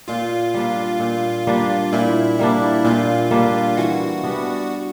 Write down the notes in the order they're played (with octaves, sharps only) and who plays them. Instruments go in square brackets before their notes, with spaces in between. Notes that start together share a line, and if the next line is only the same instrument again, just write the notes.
[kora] A#2 [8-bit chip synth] F4
[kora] G3 A#3 D4
A#2
G3 A#3 D4
[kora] A#2 [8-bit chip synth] E4
[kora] G3 A#3 D4
[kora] A#2 [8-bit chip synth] F4
[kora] G3 A#3 D4
[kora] E3 [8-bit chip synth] F#4
[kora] G3 B3 D4